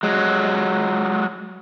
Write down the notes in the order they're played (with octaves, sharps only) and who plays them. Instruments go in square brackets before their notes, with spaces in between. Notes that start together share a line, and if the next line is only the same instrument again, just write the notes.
[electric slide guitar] F#3 G#3